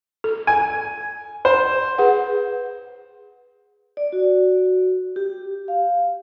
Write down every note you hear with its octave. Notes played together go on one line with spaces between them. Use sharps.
A4
G#5
C5
G#4 B4 F#5
D5
F#4
G4
F5